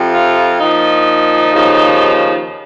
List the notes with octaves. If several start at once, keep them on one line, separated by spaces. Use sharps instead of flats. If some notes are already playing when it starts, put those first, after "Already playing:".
Already playing: F2 C3 F3
F4
A#2 F3 D#4
D#2 C#3 F3